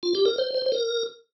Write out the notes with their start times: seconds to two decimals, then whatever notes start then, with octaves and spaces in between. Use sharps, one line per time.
0.03 F4
0.15 G4
0.26 A#4
0.38 C5
0.55 C5
0.66 C5
0.72 A#4